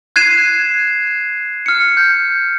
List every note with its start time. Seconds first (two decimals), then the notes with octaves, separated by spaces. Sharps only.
0.16 F#6 G#6 C7 D#7 E7
1.66 F6 C#7
1.97 G6